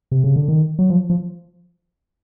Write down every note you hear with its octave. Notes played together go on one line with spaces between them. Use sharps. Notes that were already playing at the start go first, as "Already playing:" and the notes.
C3
C#3
D3
D#3
F#3
F3
F3